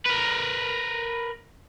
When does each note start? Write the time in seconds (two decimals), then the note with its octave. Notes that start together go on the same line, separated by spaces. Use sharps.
0.06 A#4 B4